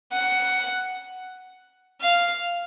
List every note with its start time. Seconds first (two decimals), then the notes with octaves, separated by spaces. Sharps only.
0.13 F#5
2.01 F5